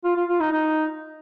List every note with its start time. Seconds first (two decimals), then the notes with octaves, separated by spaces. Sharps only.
0.05 F4
0.16 F4
0.29 F4
0.40 D#4
0.52 D#4